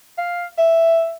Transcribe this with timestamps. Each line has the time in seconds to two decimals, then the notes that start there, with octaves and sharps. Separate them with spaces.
0.18 F5
0.58 E5